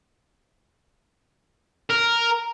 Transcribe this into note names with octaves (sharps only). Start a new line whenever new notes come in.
A#4